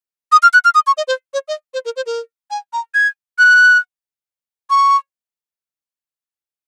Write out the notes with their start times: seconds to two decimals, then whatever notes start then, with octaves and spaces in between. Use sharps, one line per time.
0.32 D#6
0.43 F6
0.53 F#6
0.65 F6
0.75 D#6
0.87 C#6
0.97 D#5
1.08 C5
1.34 C#5
1.48 D#5
1.74 C5
1.85 A#4
1.96 C5
2.06 A#4
2.51 G#5
2.73 A#5
2.94 G#6
3.38 F#6
4.70 C#6